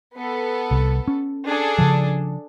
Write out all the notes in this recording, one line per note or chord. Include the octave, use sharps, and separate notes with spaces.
B3 A4
C2
C#4
D4 G#4 A4
C#3 F3